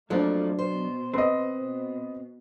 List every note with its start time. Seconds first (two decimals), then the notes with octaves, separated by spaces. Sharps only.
0.10 F2 F3 F#3 A3 A#3 D4
0.59 B2 C5
1.14 C4 B4 D#5
1.55 B2